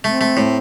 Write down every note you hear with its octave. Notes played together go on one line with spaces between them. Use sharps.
A3 C4
A3
A2